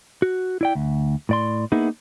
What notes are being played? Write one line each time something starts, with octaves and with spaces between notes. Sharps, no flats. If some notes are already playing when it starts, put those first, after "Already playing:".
F#4
E4 D5 G5
D2
A2 D5 C6
A#3 B3 D#4 E4 G#4